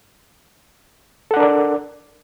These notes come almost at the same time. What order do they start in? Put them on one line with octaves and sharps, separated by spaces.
A4 F#5 D4 A#4 D5